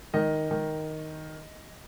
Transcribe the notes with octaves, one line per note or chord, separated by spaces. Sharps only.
D#3 D#5
D#3